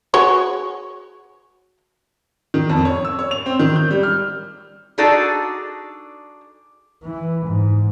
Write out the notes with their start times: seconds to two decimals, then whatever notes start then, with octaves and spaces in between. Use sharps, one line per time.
0.14 F#4 G#4 C#5
2.54 D#3
2.69 F2
2.85 C#5
3.05 E6
3.19 C#5
3.31 F7
3.46 C4
3.59 D#3
3.76 G6
3.91 G3
4.03 F6
4.98 D4 D#4 F#4 G#4 A4 D5
7.03 E3
7.47 G#2